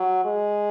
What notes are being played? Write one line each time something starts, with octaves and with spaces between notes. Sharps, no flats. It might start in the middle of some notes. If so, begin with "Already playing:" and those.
Already playing: F#3
G#3